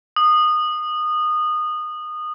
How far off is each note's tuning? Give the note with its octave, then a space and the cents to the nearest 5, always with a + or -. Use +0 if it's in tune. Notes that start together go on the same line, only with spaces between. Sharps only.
D#6 -20